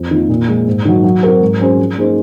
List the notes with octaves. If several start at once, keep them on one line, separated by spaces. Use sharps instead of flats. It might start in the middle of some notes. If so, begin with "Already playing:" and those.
Already playing: F2
D#3 A#3 F4
A#2
F3 G#3
G#2
D#3 F#3
F#3
C4 F#4 A#4
G#2
F#3 C#4 G#4 C5
F3
A#3 D#4 G#4 C5